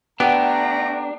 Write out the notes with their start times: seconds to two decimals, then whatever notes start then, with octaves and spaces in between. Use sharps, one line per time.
0.20 A3 B3 D4 G4 F#5 A#5